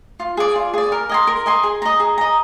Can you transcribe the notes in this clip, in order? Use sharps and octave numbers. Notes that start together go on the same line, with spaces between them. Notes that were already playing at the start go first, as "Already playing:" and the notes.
F4
G#4 D5
F4
G#4 D5
A#4
D#5 G#5 C6
A#4
D#5 G#5 C6
G#4
D#5 A#5
G#4
D#5 A#5